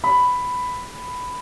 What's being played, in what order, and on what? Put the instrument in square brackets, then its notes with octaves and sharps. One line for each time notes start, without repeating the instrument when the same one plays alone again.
[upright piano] B5